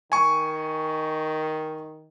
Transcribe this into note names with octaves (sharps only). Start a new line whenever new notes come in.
D#3 G#5 C#6